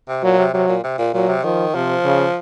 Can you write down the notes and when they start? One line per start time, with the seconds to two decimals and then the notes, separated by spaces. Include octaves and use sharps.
0.08 C3
0.23 A#2 F#3
0.39 C3
0.54 C3 F#3
0.68 A#2
0.84 C3
0.99 A#2
1.14 A#2 F#3
1.29 C3
1.44 D#3 F3
1.74 C3 F3
2.05 C#3